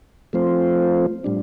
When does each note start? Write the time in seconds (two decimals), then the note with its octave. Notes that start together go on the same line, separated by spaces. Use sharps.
0.33 F3 A3 C4 F4 C5
1.24 A2 G3 D4